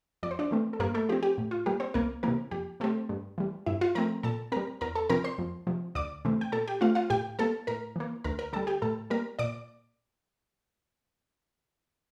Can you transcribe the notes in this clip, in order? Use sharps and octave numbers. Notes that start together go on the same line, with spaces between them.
F2 D5
C5
D4 D5
E3 A3 C4
A4
G2 A#3 A#4
A3 A4
F3 C4 G4
G4
A2
F4
G3 A#3 G4
C4 C5
C2 A#3 A#4
C3 E3 A#3 A#4
F2 G4
C3 G3 A3 C4 A4
G2
E3 G3
G2 E4 E5
F4 F5
F3 A3 C4 A#4 A#5
A#2 A4 A5
G3 C4 A#4 A#5
E2 A#4 A#5
A4 A5
C3 F3 C4 A#4 A#5
C5 C6
F2
C3 F3
D2 D5 D6
C3 E3 A3 C4
G5
A#2 A4 A5
G4 G5
A3 C4 F4 F5
F4 F5
A2 G4 G5
G3 A#3 A4 A5
A2 A#4 A#5
E3 A#3
D2 A#4 A#5
A#4 A#5
D3 G3 A4 A5
G4 G5
A2 A4 A5
G3 A#3 A#4 A#5
A#2 D5 D6